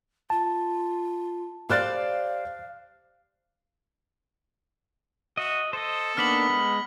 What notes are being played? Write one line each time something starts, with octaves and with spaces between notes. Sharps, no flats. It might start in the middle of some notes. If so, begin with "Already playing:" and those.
F4 A5
G4 C5 D5 F5 F6 F#6 A6
F#4 D#5 E5
A4 C5 D#5
A#3 B3 D4 D#4 F6 B6 F#7
G#3